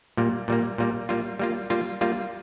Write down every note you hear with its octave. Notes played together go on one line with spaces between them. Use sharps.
A#2 G3 A#3
A#2 G3 A#3
A#2 G3 A#3
G3 A#3 F4
G3 A#3 F4
G3 A#3 F4
G3 A#3 F4